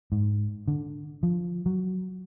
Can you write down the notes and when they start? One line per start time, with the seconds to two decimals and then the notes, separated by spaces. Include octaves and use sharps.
0.12 G#2
0.68 D3
1.23 F3
1.66 F#3